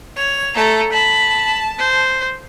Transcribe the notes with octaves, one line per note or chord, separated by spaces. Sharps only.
C#5 F7
A3 A4 A#5
A5 B5
C5